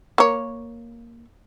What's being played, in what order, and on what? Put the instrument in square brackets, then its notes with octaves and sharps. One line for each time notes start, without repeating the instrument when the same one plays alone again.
[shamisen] A#3 C#5